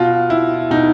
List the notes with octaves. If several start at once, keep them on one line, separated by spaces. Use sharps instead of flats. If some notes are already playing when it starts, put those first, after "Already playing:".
Already playing: B2 F4
E4
B2 D#4